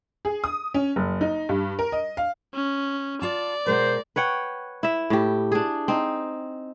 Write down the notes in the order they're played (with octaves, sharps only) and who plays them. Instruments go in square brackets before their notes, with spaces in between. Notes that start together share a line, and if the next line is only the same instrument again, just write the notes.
[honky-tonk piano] G#4
D#6
C#4
F#1
D#4
G2
A#4
D#5
F5
[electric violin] C#4
[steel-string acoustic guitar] F4 A5 [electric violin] D5
[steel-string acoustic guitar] B2 G#3 A#4 [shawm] C5
[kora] B4 C#5 F#5 G5
E4 E5
A2 G4
D4 G#4
C4 D#4